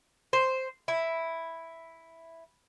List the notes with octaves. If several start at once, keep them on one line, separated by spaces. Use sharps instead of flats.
C5
E4